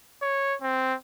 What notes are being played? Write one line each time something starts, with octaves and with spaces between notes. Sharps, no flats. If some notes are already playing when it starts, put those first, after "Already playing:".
C#5
C4